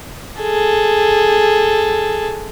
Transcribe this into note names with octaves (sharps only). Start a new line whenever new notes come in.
G#4 A4